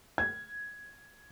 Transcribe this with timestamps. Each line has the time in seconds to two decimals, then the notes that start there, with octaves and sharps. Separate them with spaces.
0.18 G#6